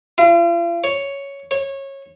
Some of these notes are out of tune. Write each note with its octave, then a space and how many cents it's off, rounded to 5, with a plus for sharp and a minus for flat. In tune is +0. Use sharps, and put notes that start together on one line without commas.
F4 -45
C#5 +5
C#5 -20